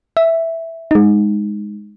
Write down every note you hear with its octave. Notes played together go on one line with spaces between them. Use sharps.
E5
G#3 D#4